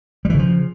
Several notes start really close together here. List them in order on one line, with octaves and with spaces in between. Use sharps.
G3 E3 C#3 F3